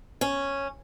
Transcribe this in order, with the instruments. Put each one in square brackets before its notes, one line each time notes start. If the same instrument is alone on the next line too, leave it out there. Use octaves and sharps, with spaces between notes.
[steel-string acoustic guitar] C#4